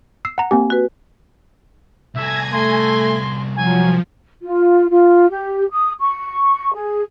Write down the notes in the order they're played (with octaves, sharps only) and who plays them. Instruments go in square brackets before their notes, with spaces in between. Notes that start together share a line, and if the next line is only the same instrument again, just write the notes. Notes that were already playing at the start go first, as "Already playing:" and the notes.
[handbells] E6 C7
F#5 A#5
[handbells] A#3 C4 G4 [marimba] G#5
[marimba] F#4 B4
[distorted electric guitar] C2 A4 [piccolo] E5 [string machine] G#5 G#6 A#6
[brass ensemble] A3 [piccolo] C6
[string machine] F3 [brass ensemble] F#3 [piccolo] G#5
[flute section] F4
F4
G4
D#6
C#6
G#4